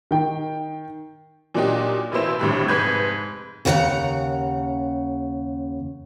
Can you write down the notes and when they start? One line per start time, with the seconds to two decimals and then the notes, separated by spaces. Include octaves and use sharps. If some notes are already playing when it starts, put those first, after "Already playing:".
0.11 D#3 G5
1.54 A#2 F#3 A#3 D4 D#4 G4
2.12 A1 B2 A#3 E4 C5 E7
2.39 G#1 A2 D3 G3 C4 B5
2.68 F1 G#2 B4 G6 G#6
3.65 D#2 C#3 F#4 B4 F#5 A#5